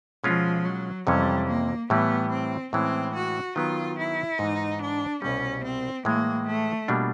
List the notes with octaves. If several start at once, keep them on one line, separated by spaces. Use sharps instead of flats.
B2 F3 G#3 C#4 F4
F#3
F2 C3 E3 G3 G#3 C#4
A#3
A2 E3 G3 B3
C4
A2 E3 G#3 C4 C#4
F#4
D#3 F#3 B3 F4
E4
G#2 E3 G#3 D#4
D4
C2 B2 G3 C#4
C4
A2 E3 G#3 A#3
A3
B2 G3 A#3 D4 F4